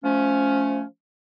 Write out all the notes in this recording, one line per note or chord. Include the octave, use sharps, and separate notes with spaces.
F3 A3 C#4